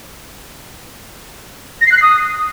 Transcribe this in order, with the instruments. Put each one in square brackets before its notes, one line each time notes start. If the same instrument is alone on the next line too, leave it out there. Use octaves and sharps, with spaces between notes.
[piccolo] A#6
C7
F#6
C7
D#6